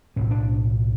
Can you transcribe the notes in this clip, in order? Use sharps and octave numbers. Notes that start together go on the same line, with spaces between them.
B1 A2 C#4
D4